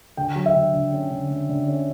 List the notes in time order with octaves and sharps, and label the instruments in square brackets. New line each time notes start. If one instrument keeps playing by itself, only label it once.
[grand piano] D3 G5
F#3
E5
D3
D3
C#4
D3
D3
D3
C#4